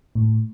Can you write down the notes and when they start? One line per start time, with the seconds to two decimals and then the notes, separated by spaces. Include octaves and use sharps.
0.15 A2